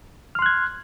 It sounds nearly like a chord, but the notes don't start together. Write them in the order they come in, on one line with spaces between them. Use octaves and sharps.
F6 C6 F#6 G#6